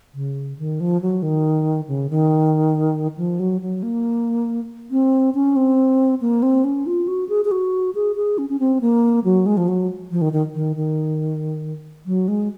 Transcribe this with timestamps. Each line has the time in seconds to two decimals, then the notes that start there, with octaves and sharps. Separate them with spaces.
0.14 C#3
0.59 D#3
0.80 F3
1.02 F#3
1.23 D#3
1.88 C#3
2.10 D#3
3.17 F3
3.39 F#3
3.61 F#3
3.83 A#3
4.91 C4
5.35 C#4
5.56 C4
6.21 A#3
6.43 C4
6.64 C#4
6.86 F4
7.08 F#4
7.29 G#4
7.45 G#4
7.51 F#4
7.95 G#4
8.16 G#4
8.38 C#4
8.50 C#4
8.59 C4
8.81 A#3
9.24 F#3
9.46 G#3
9.57 F3
9.68 F#3
10.11 F3
10.21 D#3
10.33 D#3
10.54 D#3
10.76 D#3
12.06 F#3
12.28 G#3